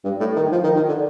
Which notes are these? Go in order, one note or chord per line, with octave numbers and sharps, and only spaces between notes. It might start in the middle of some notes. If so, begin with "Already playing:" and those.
G2
A2
D#3
F3
D#3
D#3
D3